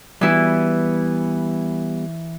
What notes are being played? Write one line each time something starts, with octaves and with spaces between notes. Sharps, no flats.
E3 G3 B3 E4